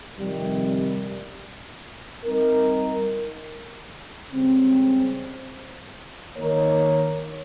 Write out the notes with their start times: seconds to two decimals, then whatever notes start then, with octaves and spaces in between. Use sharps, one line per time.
0.17 F2 C3 D#3 G3
2.24 G3 C4 D#4 A#4
4.31 C#2 C#3 G3 C4
6.38 D#3 A#3 D#4 A#4 C#5